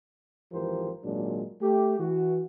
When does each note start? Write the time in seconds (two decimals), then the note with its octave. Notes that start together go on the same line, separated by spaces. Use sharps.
0.52 G#1 E3 F3 G4 A#4 C5
1.04 G#1 A#2 F#3 G#3 D4
1.62 A3 G4
1.98 E3 F#4